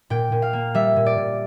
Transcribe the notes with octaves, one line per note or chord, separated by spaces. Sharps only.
A#2 G5
A#2
F5
A#3
G3 E5
A#2
D5
A#2